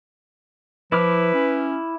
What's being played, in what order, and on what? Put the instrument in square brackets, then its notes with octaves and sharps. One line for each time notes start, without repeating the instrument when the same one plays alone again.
[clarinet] F3 [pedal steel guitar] E4 D6 F6 [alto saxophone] B4
[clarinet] C#4